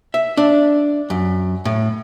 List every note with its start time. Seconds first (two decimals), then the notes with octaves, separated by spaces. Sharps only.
0.14 E5
0.37 D4
1.10 F#2
1.65 A2